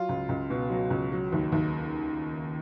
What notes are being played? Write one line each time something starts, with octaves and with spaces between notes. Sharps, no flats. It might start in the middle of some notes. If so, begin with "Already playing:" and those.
Already playing: F#3 F4
C#2
C#2
B2
F#3
C#2
F#3
D#2
D#2